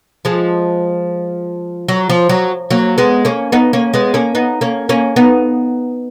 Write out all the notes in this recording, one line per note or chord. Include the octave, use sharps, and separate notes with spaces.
F3 G#3
F#3
F3
F#3
F#3 A#3
G#3 B3
A#3 C#4
B3 D#4
A#3 C#4
G#3 B3
A#3 C#4
B3 D#4
A#3 C#4
A#3 C#4
B3 D#4